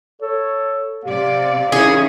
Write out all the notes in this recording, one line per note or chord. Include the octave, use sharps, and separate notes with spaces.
A4 C#5
C3 G4 D5 F5
D#3 C#4 E4 G#4